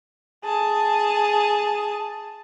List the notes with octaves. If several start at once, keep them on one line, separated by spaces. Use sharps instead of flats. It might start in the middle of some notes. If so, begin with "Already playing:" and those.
G#4 A5